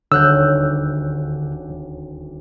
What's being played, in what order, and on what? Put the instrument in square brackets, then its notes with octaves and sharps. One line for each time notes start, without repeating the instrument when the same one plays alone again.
[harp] D#1 D2 C#5 [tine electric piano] D3 [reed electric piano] E6 F#6 G6